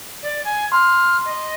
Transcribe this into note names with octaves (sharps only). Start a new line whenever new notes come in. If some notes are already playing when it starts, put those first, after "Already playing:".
D5
G#5
C6 F6
D#5